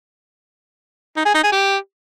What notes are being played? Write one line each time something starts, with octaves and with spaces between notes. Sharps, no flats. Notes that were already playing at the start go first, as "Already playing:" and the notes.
D#4
G#4
D#4
G#4
G4